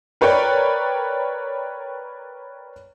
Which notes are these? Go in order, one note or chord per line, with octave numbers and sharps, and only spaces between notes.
A#4 B4 C#5 D5 G5